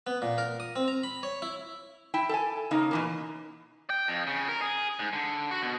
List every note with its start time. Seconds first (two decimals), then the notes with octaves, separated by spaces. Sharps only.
0.07 B3
0.22 A#2
0.38 A#4
0.60 D#6
0.76 C4
0.88 A#5
1.03 B5
1.23 C#5
1.42 E4
2.14 E4 G5
2.29 A4 G5 G#5
2.71 C#3 A#3 D#4
2.91 B2 E3 A#3
3.90 G5
4.08 F2
4.27 C#3
4.49 A#4
4.62 G#4
4.99 G#2
5.13 D3
5.51 F#4
5.62 B2